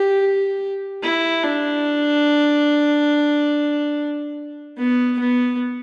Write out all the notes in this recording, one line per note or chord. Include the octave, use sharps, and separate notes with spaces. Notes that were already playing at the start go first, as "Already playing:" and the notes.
Already playing: G4
E4
D4
B3
B3